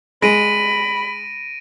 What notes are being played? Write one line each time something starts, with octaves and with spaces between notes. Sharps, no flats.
G#3 B5 A#6 D7 D#7